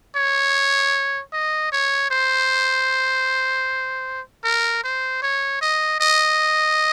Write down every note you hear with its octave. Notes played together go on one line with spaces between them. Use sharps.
C#5
D#5
C#5
C5
A#4
C5
C#5
D#5
D#5